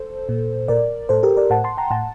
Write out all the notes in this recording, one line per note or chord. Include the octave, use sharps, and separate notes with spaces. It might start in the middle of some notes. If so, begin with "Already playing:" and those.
Already playing: A4 C5
A#2
A#2 A#4 D5
A2 A4 C5
G4 A#4
A#4 D5
A2 F#5 A5
A5 C6
G5 A#5
A2 F#5 A5